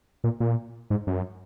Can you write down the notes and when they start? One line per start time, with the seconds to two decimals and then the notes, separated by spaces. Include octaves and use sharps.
0.24 A#2
0.40 A#2
0.90 G#2
1.07 F#2